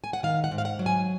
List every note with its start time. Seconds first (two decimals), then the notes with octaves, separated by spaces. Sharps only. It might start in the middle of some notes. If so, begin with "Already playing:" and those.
0.04 G#5
0.13 F#5
0.23 D#3 F5
0.44 F#5
0.51 G#2
0.58 F5
0.65 F#5
0.79 F#3
0.86 G#5